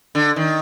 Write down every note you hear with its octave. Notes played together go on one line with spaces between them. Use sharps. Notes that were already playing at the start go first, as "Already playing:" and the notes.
D3
D#3